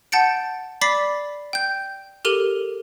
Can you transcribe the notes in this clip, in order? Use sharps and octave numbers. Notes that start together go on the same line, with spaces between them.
F#5 A5 G6 A6 C#7 D7
D5 B5 D6 A6 B6 C7
G5 G6
G4 A4 A#4 D#7 F7 G7